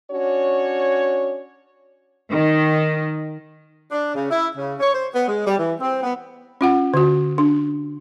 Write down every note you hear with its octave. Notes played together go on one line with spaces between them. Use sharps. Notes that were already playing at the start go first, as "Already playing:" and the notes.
C#4 D4 F#4 C#5
D#3
D4
C#3
E4
C#3
C#5
C5
B3
G#3
G3
E3
C4
B3
C#4 F4 F#5
D3 F#4
D4